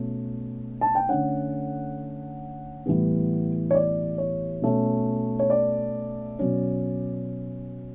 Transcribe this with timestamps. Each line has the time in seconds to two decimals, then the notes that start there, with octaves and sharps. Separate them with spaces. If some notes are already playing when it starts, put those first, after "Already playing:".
Already playing: B2 A3 C#4
0.81 A5
0.95 G5
1.09 D3 A3 C#4 F#5
2.86 A2 E3 G3 B3
3.71 C#5
3.74 D5
4.18 C#5
4.62 B2 A3 C#4
5.39 C#5
5.50 D5
6.39 B2 F#3 C#4